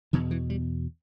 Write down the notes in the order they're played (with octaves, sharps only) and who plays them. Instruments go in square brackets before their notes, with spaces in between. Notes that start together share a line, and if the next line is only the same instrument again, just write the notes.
[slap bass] E2 B2 D#3
E3
G3